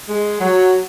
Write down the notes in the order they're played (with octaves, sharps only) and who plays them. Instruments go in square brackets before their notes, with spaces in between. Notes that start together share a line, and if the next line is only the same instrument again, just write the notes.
[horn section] G#3
F#3